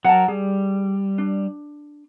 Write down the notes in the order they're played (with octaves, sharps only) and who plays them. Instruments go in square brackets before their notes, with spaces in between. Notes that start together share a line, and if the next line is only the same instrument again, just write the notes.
[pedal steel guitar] F#3 A#4 [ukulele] F#5 A5
[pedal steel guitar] G3 [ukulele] G#4
[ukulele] D4